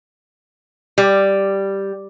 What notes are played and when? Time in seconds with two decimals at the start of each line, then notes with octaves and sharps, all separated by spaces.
0.98 G3